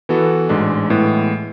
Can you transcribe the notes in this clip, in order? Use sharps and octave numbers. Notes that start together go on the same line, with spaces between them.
E3 B3 F#4 A4
A1 G#2 G#3 D4
A2 E3 G#3 B3